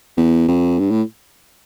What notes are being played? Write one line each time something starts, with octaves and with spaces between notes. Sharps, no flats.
E2
F2
G2
A2